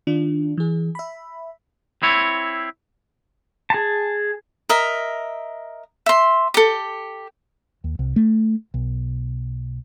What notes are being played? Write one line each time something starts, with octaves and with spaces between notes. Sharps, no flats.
D#3 D4 F4
E3 G#4
E5 B5
C4 E4 C#5
G#4 A5
A#4 D#5 E5
E5 C6
G4 A4
D#2
C2
A3
B1